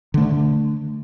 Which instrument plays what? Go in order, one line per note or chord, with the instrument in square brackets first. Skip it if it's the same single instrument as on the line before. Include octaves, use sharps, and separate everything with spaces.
[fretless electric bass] D3 A3